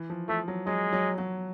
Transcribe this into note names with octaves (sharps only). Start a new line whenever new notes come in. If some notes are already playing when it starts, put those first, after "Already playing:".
Already playing: E3
F3
F3 A3
F#3
F#3 G#3
F#3
F#3